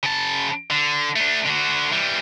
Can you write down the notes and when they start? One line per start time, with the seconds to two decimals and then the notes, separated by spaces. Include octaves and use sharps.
0.03 C#3 A5
0.70 D3
1.16 A3 D4
1.47 D3 F#4
1.92 E3 G3